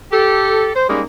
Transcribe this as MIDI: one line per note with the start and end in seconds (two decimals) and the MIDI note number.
0.12 0.70 67
0.12 0.70 69
0.75 0.85 72
0.89 1.02 55
0.89 1.02 56
0.89 1.02 58
0.89 1.02 61
0.89 1.02 63